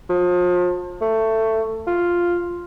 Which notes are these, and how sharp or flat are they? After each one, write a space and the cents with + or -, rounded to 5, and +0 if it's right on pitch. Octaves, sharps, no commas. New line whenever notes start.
F3 +35
A3 +15
F4 +0